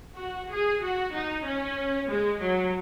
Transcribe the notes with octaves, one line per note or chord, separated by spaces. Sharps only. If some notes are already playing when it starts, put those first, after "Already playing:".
F#4
G#4
F#4
D#4
C#4
G#3
F#3